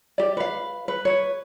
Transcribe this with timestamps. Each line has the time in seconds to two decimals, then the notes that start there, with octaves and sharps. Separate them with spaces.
0.18 G4 D5
0.37 B4 F5
0.88 B4
1.05 B4 C#5